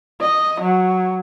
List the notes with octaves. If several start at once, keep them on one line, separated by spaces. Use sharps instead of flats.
D#5
F#3